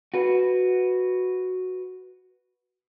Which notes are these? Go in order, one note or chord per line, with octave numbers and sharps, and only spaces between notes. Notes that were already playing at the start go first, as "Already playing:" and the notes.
F#4 B4